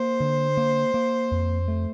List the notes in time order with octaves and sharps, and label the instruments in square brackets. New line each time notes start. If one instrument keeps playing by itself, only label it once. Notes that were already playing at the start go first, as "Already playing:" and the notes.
Already playing: [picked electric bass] A#3 [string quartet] C5
[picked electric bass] D3
A#3
A#3
F2
A3